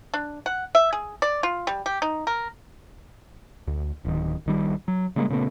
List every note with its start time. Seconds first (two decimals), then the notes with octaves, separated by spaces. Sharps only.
0.14 D4
0.46 F#5
0.75 E5
0.93 G#4
1.22 D5
1.43 F4
1.67 G3
1.86 G4
2.02 D#4
2.27 A#4
3.67 D2
4.05 D1 D#3
4.46 A#1 D#3 G3
4.88 F#3
5.16 C#3 G3 G#3 A#3
5.29 A#2 C#3 A3 B3